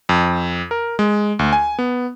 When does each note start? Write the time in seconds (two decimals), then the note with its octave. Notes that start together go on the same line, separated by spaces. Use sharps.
0.09 F2
0.71 A#4
0.99 G#3
1.39 D2
1.53 G#5
1.79 B3